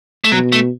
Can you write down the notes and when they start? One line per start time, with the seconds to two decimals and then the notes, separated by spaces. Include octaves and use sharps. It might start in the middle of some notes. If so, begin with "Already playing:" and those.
0.24 A3
0.32 B2 F#3
0.52 A3